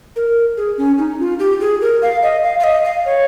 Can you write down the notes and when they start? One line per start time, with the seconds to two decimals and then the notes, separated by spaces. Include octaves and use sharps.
0.16 A#4
0.57 G#4
0.78 C#4
0.98 D#4
1.20 F4
1.40 G4
1.61 G#4
1.81 A#4
2.02 F5
2.23 D#5
2.44 F5
2.60 F5
2.64 D#5
2.85 F5
3.05 C#5